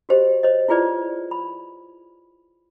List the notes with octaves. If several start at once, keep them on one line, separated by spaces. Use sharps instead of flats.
F#4 G4 C5 D#5
C5 C#5 D#5
E4 F4 G#4 B4 D5
B5